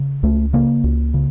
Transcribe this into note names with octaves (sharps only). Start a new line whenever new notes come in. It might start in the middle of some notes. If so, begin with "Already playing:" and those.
Already playing: C#3
C#2 A3
C#3 A#3
C#2
C#3